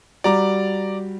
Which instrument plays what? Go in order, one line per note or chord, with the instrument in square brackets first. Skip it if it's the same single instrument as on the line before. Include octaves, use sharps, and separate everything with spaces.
[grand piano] G3 F#4 [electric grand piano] D5 A#5 D6